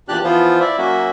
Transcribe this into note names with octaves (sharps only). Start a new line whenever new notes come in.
E2 A#2 D4 G4 D5 F#6
E3 F3 B3 F4 C5
E4 D5 E5
F#3 A#3 C#4 F#4 E5